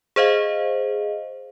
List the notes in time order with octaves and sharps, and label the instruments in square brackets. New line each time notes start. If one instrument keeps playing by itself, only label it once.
[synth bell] G#4 C5 D#5 F5